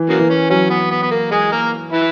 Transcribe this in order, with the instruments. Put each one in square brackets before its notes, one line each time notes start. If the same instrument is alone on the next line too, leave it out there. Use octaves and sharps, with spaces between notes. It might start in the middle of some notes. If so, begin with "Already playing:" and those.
Already playing: [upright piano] E3
[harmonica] C#3 F#3 A#3
[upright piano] E3
[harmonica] C#4
[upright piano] F#3 [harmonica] C#4
[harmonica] B3
B3
B3
A#3
G#3 G#4
A#3 A#4
E3 E4